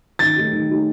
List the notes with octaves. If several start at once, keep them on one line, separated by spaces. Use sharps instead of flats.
D#3 A6
A3 D#4 G4
D#3
A3 D#4 G4